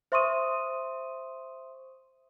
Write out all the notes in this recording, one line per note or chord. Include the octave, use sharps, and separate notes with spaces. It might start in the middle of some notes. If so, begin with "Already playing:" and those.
C5 E5 C6 C#6 D#6 D#7